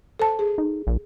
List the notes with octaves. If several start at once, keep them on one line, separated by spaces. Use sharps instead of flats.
A4 C5 A5
G#4
D#4
A#1